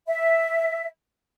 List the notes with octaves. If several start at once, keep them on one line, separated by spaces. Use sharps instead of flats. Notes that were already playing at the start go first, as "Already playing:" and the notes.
E5